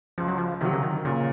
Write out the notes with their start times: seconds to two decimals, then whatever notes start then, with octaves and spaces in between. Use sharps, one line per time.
0.18 C#2 F3
0.28 F#3
0.38 F3
0.61 C3 D#3 F#3
0.73 C#3
0.83 D#3
1.05 A#2 C#3